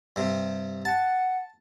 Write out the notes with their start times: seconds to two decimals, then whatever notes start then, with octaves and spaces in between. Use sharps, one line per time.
0.16 G2 C3
0.85 F#5 A5